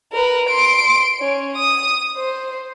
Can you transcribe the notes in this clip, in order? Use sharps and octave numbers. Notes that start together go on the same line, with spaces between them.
A#4 B4
C6 D7
C#4
D#6
C5